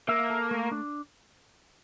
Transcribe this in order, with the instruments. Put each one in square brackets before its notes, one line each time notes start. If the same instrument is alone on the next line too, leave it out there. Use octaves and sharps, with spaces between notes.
[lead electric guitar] A#3 [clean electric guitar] E5
[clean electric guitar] A4
A3
D4